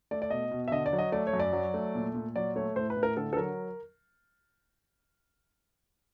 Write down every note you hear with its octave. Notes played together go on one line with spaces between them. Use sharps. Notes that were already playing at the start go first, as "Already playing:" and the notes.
A3 D5
D5
B2 D#5
B2
E5
D3 D#5
D5
F#3
D#5
A3 D5
C#5
F#2
D5
F#3
A3
A#2
A#2
F#3 D5
A3 C#5
A2 C5
B4
A2
A#4
D3 A4
A4
F#3 A#4